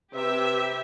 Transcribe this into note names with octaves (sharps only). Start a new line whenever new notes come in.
C3 G4 B4 E5